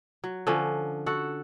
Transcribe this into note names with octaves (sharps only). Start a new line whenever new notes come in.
F#3
D3 F3 C#4
F#4 A4 F#5